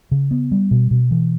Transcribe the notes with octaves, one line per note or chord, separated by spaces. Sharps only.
C#3
B3
G3
B2
B2
E3